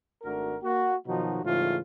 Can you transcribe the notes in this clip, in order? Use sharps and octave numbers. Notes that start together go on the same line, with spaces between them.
G#1 A3 D4 F#4 A#4
A#3 F#4
B2 D#3 F3 F#3 D#4 F#4
G#2 C#3 E3 G3 A3 F4